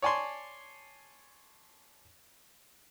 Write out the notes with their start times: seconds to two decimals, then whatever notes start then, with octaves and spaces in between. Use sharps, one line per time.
0.02 C#5 D5 G#5 A5 C6